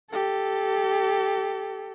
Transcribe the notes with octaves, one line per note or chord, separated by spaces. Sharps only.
G4 A4